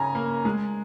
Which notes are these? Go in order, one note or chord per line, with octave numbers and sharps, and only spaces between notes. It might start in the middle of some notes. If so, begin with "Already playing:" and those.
Already playing: C#3 C#4 G#5 A#5
A#3
G#3